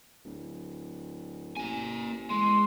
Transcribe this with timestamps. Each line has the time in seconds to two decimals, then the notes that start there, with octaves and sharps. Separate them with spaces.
0.25 D1
1.57 A1 A#3 G#5
2.30 E2 G#3 C6